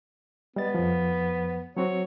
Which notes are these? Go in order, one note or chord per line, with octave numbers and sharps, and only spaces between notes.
G3 B3 D#5 A6
F2 F3
F#3 C4 F#4 C#5